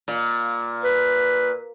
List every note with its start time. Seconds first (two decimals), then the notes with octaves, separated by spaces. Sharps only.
0.08 A#2
0.83 B4